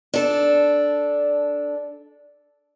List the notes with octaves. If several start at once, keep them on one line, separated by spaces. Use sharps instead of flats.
D4 A4